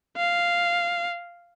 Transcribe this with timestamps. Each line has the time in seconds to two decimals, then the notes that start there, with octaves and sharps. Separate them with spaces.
0.17 F5